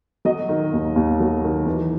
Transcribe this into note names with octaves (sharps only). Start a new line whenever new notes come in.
F#3 D#5
D#3
D#2
D#2
F#3
D#3
E3